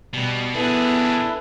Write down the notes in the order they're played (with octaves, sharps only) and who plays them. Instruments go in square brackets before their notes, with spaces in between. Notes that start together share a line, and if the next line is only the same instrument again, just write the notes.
[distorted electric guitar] B2 [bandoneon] G3
[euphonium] B3 [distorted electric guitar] D4 G#4 [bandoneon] E4 A4 B4